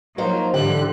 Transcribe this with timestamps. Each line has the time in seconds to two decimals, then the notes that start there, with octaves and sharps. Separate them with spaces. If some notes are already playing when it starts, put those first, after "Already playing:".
0.18 F3 F#3 A#3 D#4 C5
0.54 G#2 D3 E3 F3 G3 G4 F#6